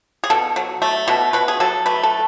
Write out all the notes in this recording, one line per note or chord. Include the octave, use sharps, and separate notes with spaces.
G#4
B2 A4
F#3
A3
B2
B2 B4
G#4
F#3 A4
A3 B4
A4